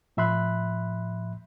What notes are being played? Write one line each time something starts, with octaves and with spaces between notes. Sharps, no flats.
A2 F3 E5 B5 C6 F#6